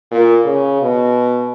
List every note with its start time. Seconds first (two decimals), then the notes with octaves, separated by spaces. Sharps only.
0.11 A#2
0.45 C#3
0.81 B2